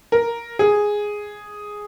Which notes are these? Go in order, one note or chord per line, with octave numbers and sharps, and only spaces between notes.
A#4
G#4